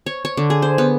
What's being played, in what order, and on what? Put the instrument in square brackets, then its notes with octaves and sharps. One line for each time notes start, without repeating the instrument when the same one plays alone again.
[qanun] C#5
C#5
D3
G#4
C5
B3